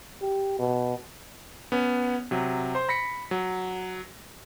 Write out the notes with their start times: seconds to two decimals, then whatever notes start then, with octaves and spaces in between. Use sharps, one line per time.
0.21 G4
0.59 B2
1.72 B3 C#4
2.31 C3 F#3
2.75 C5 C6
2.89 B5 A#6 B6 C#7
3.31 F#3